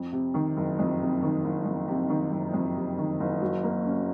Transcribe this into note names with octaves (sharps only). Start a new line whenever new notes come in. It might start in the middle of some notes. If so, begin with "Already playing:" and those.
Already playing: F2
C3
D#3
F#1
F2
C3
D#3
F#1
F2
C3
D#3
F#1
F2
C3
D#3
F#1
F#3
A#3
C#4